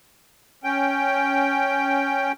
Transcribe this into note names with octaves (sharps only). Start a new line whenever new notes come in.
C#4 G5